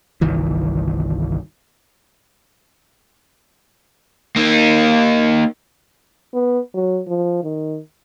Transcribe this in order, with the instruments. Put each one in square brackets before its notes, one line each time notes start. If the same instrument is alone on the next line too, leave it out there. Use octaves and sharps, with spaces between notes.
[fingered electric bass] G1 C2 D#3 E3
[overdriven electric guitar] A#3 D#4
[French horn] B3
F#3
F3
D#3